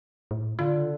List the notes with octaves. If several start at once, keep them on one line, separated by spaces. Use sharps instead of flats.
A2
D3 F4